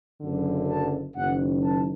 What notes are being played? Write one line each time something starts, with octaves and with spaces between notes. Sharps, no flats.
F#1 F#2 D3
A5
F#1 F#2 D#3 F#5
A5